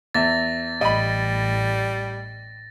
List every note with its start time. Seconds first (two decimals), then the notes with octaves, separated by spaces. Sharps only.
0.14 E2 E5 A6 A#6
0.81 A1 G3 D#5 B5